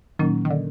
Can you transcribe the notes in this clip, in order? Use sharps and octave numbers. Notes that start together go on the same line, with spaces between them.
A#2 D#3 F#3 A#3 C#4
D#3
D3